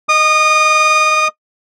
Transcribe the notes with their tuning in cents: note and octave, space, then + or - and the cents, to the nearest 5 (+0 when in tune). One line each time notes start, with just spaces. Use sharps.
D#5 +0 D#6 -25